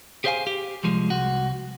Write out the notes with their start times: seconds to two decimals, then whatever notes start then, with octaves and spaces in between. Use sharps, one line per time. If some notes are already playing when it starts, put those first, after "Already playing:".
0.24 G4 G#4 C5 D#5 F5 G#5
0.47 G4
0.84 C2 F3 G#3
1.10 C2 F#4